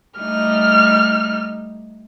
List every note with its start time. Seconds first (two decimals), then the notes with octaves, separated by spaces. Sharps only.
0.19 G3 A3 D#4 F6